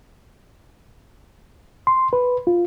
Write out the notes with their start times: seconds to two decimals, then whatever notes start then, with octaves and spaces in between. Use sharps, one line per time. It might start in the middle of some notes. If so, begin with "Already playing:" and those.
1.87 C6
2.13 B4
2.47 F4